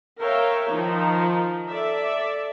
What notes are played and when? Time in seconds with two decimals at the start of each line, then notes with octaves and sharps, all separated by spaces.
0.19 A#4 C#5 E5 F5 G5
0.71 D#3 F3 D#4
1.68 A4 D5 E5